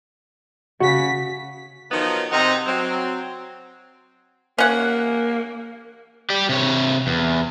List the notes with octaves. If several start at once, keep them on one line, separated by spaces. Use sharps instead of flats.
C#3 F#4 B6
D#3 F3 F#3 B3 D#4
C3 C4 D#4 F#5 A#5
F#3 C4
A#3 C#4 F#5
G4 D5
C3 C#5
E2